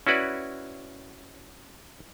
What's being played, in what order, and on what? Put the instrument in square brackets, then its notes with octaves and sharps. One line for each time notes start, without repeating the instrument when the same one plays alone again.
[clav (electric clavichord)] C#4 E4 F#4 B4 D5